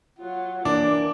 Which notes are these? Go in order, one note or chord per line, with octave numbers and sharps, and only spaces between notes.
F#3 F4 F#5
E3 A#3 D4 D5 D6